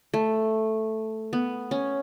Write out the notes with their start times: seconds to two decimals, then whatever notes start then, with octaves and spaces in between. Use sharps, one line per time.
0.14 A3
1.33 B3
1.71 C#4